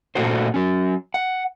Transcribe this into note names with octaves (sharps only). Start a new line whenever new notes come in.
A#2 A3 D4 F#4 C5
F#3 C#4
F#5